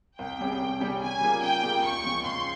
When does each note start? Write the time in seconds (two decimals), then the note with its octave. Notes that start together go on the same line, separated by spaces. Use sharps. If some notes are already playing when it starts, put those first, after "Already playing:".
0.18 C2 G5
0.39 C3 G3 C#4 G#4
0.60 C2
0.80 C3 G3 C#4 G#4
1.01 C#3 G#5
1.21 G3 A#3 F4 G#4
1.42 C#3 G5
1.63 G3 A#3 F4 G#4
1.82 C#2 C#6
2.04 C#3 F3 G#3
2.24 C#2 C6